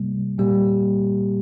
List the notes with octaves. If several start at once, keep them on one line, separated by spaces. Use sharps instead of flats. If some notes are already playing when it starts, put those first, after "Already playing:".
Already playing: C3 G3 A#3
A#2 G3 A#3 G4